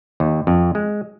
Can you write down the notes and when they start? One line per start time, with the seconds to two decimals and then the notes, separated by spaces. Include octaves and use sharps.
0.20 D#2
0.47 F2
0.75 G#3